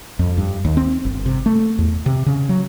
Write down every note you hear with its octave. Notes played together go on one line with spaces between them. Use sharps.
F2
G2
D#2
C4
G1
C3
A3
E2
C3
C#3
F#3